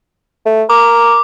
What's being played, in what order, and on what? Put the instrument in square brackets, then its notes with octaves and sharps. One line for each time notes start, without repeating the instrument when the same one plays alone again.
[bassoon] A3
[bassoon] A#4 [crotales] D6